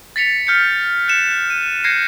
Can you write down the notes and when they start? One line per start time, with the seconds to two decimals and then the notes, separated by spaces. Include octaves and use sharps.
0.16 A6 B6 C#7 F7
0.47 F6 G6 B6 C#7
1.08 F#6 C#7 E7
1.50 D#7
1.84 G6 G#6 A#6 C7 C#7